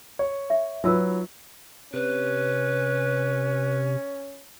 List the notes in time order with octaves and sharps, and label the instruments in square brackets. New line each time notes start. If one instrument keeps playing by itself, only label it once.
[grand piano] C#5
[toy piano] E5
[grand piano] F#3 B4 [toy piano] D#4 F4 E6
[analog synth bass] C3 [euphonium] C#4 [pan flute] B4